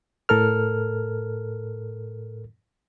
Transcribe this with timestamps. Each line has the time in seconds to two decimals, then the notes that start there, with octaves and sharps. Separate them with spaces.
0.29 A2 A4 A#4 F6